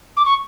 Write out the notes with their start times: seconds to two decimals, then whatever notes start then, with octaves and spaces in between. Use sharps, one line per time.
0.17 D6
0.25 C#6